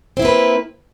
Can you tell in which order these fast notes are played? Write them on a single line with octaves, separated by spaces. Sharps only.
C4 E4 A#3 B4